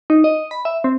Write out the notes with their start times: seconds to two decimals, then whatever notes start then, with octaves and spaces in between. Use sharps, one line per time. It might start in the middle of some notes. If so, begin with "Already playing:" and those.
0.10 D#4
0.24 D#5
0.51 B5
0.65 E5
0.84 C4